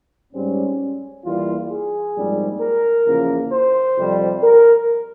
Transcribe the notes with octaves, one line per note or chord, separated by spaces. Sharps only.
G#2 G3 C4 C#4
E2 E3 G3 A#3 F4
G#4
A#1 G#2 G3 C4
A#4
E2 C#3 F3 A#3
C5
F2 C3 G3
A#4